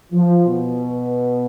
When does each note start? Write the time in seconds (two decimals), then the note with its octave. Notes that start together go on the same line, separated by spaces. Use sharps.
0.12 F3
0.45 B2